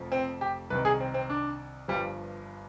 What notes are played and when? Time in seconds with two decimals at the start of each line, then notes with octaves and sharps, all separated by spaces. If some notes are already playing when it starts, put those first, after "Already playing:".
Already playing: F1 F2 F3
0.12 C4
0.41 G4
0.70 C2 C3 D#3 B4
0.85 G#4
1.00 C4
1.14 C4
1.30 D4
1.88 G1 G2 F3 G3